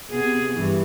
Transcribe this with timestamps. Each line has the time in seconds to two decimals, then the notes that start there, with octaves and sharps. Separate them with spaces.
0.10 C3 B3 G#4
0.54 G2 E3